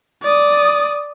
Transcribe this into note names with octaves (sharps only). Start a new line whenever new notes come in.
D5 D#6